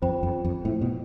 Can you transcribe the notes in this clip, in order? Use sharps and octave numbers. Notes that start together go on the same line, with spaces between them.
F2 F4 C5 G5 B5
F2
F2
A2
B2